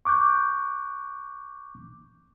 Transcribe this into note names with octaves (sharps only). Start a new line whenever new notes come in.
C#6 D6 F#6 G6